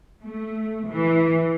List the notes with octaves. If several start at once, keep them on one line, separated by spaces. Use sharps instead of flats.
A3
E3